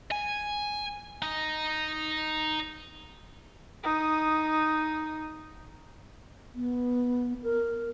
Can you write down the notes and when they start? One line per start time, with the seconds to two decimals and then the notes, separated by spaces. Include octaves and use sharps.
0.12 G#5
1.22 D#4
3.83 D#4 D#6
6.55 B3
7.43 A#4